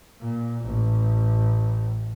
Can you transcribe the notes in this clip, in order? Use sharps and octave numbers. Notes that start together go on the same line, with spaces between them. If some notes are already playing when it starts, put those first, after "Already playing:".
A#2
A1